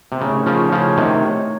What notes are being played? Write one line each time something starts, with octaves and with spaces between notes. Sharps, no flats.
C3
A2 C#3 A3 D#4 A#4 C#5
C#3 F3
C#3 F3
C3 D#3